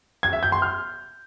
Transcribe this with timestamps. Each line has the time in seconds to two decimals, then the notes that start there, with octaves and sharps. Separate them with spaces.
0.23 G#6
0.33 E5
0.43 G6
0.52 C6
0.62 F6